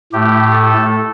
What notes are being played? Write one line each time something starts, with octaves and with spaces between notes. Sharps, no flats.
A2 A3 G4
A4